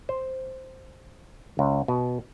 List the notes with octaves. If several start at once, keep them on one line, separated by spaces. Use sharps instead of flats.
C5
C#2
B2